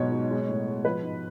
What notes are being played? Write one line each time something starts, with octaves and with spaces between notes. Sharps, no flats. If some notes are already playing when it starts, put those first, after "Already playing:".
Already playing: G#2 B2 F#3 C#5
F#3
G#3
A2
G#3
F3 B4
G#2